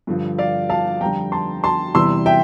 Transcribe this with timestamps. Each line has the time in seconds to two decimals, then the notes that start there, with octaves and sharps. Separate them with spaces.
0.07 G2 D3 F3
0.38 D5 F5
0.70 F5 A5
1.01 F2 D3 G3 G5 A#5
1.32 A5 C6
1.64 A5 C6
1.94 E2 C3 E3 G3 C6 E6
2.26 E5 G5